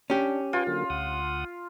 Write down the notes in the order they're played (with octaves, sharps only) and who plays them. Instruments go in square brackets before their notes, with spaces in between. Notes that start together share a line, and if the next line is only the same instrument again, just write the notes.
[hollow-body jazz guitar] C#4 G4 [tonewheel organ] D4
[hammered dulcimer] F4 [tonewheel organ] B4 G5 G#5
[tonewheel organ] D3 F#3 A#3
D2 F#5 D#6